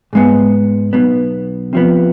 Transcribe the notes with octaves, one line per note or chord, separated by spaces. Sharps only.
G#2 G#3 B3
B1 B2 B3
C3 F3 B3